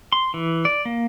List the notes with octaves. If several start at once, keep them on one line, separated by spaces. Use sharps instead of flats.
C6
E3
D5
A#3